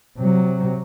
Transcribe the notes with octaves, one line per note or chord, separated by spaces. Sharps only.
C3 F#3